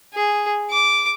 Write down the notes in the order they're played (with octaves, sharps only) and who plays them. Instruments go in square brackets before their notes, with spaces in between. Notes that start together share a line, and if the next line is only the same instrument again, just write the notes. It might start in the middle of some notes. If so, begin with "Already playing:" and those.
[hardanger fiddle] G#4
D6